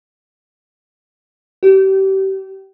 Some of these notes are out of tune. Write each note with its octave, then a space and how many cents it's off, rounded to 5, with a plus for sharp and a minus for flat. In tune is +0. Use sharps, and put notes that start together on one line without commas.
G4 -30